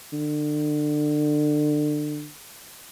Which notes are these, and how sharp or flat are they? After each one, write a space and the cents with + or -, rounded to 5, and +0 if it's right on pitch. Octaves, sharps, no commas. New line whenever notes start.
D3 +30